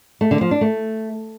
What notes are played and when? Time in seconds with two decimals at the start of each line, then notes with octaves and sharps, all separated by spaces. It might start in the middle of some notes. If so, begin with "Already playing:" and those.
0.21 A3
0.31 D3
0.41 F3
0.51 D4
0.61 A3